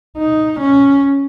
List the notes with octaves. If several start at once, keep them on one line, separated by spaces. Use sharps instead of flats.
D#4
C#4